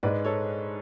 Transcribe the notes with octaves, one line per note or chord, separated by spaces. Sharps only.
G#2 G#3 B4 D5
A4 C#5